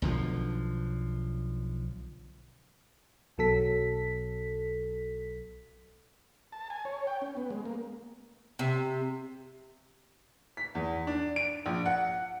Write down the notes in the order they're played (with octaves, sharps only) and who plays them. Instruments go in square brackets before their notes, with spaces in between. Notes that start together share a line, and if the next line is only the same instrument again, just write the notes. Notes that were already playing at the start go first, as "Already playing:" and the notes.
[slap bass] B1 D3 F3
[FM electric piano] B1 B2 F#3 A4 B6
[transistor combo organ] A5
G#5
C#5
G5
C#4
B3
G#3
A#3
[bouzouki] C3
[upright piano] B6
E2
D4
D7
A#1
F#5